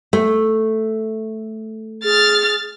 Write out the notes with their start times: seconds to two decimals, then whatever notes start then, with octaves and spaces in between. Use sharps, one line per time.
0.13 A3
2.04 G#4 F6 A6